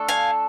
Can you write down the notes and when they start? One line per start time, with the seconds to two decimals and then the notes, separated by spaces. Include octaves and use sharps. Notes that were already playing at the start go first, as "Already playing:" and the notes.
Already playing: A3 D4 A4
0.09 F5 G#5